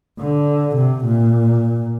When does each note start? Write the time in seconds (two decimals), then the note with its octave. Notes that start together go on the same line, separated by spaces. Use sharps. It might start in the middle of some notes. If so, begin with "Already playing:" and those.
0.20 D3
0.76 C3
1.05 A#2